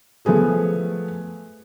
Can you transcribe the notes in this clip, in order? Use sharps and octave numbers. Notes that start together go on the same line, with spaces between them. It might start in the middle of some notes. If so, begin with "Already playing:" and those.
F3 A3 B3 G#4 A4